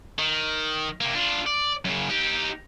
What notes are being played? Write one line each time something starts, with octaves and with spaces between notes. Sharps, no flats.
D#3
C3 A#3
D4 F4
D5
F#2 C#3
D#4 G4